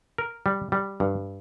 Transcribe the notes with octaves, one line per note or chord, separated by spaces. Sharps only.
A#4
G3
G3
G2